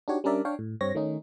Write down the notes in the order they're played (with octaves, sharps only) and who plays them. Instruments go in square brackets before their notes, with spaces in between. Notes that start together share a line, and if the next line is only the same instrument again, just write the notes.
[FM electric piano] D4 D#4 F#4 G4 C#5
G3 C#4 D4 A#4 D5 E5
D4 C#5 F5 G5
A2
G2 C4 C#5 A#6
D#3 A3 C#4 D#4